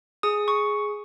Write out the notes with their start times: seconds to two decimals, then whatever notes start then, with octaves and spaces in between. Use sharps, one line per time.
0.23 G#4 D#6
0.48 C#6